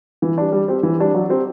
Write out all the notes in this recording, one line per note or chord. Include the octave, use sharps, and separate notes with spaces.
E3
G3 D4
G3
C4 G4
E3
G3 D4
F#3
C4 G4